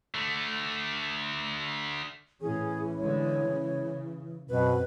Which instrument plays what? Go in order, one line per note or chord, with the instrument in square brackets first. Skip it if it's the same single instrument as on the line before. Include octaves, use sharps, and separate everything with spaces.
[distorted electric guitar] D3 A3
[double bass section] A2 C#4 [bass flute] E3 [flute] G#4
[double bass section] D3 G#3 [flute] C#5
[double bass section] C#3
[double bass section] F#2 [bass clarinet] B2 [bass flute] C4 [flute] B4